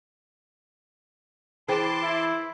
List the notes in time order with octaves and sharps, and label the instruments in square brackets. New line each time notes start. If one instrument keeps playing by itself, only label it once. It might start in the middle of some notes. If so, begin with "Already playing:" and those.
[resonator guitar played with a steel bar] E3 [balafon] G#4 C5 G5 [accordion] A5 C6 D6
[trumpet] E4